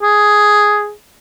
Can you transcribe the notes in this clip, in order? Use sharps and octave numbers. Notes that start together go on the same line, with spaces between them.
G#4